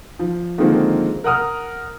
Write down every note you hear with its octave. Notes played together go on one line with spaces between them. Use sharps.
F3
D3 D#3 F3 G#3 A#3 C4
A#4 F#5 D#6 F6